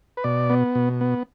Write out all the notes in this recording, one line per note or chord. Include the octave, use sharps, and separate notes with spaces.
B4
B2 D5
B3
B2
B3